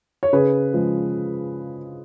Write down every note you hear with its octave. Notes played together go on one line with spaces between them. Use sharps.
C#5
C#3 G#4 B4
F3 G#3